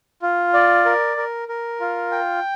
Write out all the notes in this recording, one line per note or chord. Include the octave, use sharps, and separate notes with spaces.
F4
D5
A#4
A#4
A#4
F4
G5